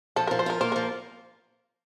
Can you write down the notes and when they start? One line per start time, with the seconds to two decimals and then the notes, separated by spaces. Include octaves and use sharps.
0.16 F3 A4
0.27 A#4
0.31 F3
0.39 C5
0.46 F4 A#4
0.61 A#3 C5
0.72 A#4
0.76 F3